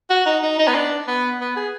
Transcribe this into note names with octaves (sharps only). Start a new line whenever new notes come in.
F#4
D#4
D#4
D#4
B3
D4
B3
B3
G#4